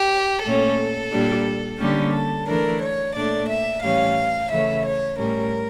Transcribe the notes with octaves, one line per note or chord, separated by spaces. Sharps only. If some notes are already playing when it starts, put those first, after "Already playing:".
Already playing: G4
A#2 A3 C#4 A4
A#2 G3 D4
D3 G3 A#3 C#4 G4
A4
E3 A3 D4 A#4
C#5
A#2 A3 D4 D5
E5
A2 E3 G3 C#4 F5
C#3 E3 A3 C#4 E5
C#5
A2 G3 C#4 A#4